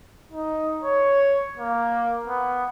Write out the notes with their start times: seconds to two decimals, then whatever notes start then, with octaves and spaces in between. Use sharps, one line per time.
0.32 D#4
0.83 C#5
1.58 A#3
2.27 B3